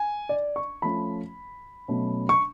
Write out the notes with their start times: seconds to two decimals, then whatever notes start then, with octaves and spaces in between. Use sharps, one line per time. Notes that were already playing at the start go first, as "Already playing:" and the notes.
Already playing: G#5
0.29 D5
0.56 C#6
0.82 F3 A3 C#4 F4 B5
1.88 B2 F#3 A3 C#4
2.29 C#6